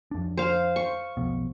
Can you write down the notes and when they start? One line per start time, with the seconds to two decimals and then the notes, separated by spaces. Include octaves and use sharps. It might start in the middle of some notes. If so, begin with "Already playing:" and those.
0.11 F2 D4
0.37 C5 F5
0.76 C#6
1.17 B1 F2 B2